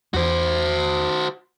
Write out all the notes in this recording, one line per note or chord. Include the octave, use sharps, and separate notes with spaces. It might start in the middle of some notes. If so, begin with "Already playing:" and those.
E2 E3 F#4 C5